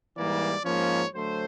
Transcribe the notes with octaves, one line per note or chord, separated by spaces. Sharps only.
G#2 E3 G3 A#3 D5
G#2 F3 A#3 C#4 C#5
D3 F#3 A3 C5